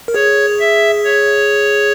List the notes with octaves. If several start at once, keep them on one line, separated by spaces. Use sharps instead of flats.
A#4
G#4 C#5
E5
C#5